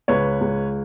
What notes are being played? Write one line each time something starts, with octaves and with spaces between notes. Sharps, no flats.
C#2 B4 C#5
C#2